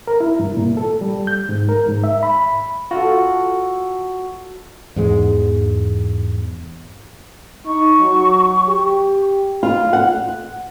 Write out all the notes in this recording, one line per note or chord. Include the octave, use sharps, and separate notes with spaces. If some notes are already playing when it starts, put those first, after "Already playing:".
A#4
E4
G2
A#2
A4
G3
G6
G#2
A#4
G#2
E5
B5
F4 F#4 A4
E2 G#2 G#3
D#4 C#6
F#3
G4
F4
F#5